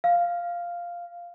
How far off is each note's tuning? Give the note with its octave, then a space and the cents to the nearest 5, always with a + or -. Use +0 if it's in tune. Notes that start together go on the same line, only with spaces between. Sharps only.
F5 -5